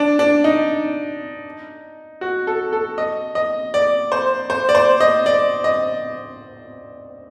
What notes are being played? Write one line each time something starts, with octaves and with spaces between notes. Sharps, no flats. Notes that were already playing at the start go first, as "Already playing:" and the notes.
Already playing: D4
D4
D#4
F#4
A4
A4
D#5
D#5
D5
C5
C5
D5
C5
D#5
D5
D#5